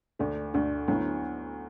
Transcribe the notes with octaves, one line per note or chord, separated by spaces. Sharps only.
D2 D3 A3 D4
D2 D3 A3 D4
D2 D3 F#3 B3 E4